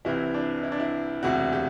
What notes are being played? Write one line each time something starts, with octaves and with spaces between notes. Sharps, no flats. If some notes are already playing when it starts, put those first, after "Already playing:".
C2 C3 E3 E4
D4
E4
D4
E4
E1 D2 C3 F#4
G4